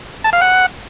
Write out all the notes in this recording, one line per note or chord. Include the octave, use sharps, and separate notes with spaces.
A5
F5
F#5